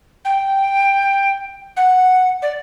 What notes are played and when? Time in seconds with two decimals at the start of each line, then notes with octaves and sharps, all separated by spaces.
0.25 G5
1.76 F#5
2.42 D5